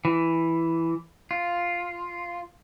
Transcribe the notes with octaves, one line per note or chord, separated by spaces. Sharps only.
E3
F4